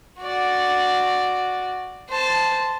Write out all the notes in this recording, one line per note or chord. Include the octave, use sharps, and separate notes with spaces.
F#4 D5
C5 A5